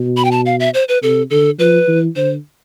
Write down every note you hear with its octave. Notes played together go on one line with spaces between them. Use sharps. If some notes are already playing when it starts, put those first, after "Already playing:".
Already playing: B2
B5
G5
A5
F5
E5
C5
B4
C3 A4
D3 A4
F3 B4
E3
D3 C5